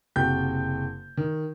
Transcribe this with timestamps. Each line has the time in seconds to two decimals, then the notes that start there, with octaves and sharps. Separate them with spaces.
0.16 F#1 C3 F#4 G5 G6
1.17 D#3